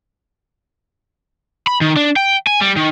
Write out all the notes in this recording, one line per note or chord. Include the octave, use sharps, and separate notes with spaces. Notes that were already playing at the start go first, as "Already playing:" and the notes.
B5
D#3
D4
G5
G#5
G3
D#3